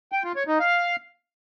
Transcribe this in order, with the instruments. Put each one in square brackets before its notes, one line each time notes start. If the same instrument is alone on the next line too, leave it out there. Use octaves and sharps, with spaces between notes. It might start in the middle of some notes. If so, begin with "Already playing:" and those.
[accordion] G5
F4
C#5
D#4
F5